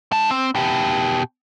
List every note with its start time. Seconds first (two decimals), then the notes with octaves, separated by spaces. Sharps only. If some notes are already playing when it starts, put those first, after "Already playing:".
0.12 D#4 A5
0.31 C4
0.55 B2 G4